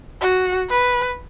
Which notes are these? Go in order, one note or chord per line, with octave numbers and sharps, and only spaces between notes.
F#4
B4